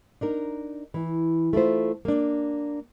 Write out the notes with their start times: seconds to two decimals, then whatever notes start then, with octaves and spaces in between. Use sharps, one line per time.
0.21 D4 D#4 A#4
0.94 E3
1.53 A3 E4 F4 C5
2.05 A#3 D4